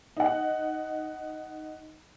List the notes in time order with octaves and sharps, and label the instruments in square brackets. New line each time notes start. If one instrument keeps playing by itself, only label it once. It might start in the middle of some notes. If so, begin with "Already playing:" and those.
[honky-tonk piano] D#4 F#5